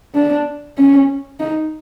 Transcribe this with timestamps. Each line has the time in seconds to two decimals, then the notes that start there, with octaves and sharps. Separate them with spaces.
0.15 D4
0.78 C#4
1.40 D#4